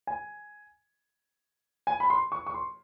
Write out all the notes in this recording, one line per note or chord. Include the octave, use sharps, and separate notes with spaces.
G#5
G#5
B5
C6
C#6
C#6
C6